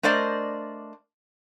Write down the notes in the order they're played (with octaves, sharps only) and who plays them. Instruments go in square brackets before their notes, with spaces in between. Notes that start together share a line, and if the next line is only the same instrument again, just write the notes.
[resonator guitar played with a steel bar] A3 D4 A#4 C5 D5 D#5